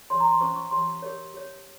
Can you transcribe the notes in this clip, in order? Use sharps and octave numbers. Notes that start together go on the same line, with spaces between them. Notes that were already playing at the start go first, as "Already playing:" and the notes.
G4 C#5 C6
A#5
C6
C#4 F4 C5 C#6
C#6
G4 C#5 C6
G4 A#4 C#5
G4 C#5